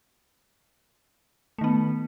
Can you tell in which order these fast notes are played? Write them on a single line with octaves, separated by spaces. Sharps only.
A3 D#3 B3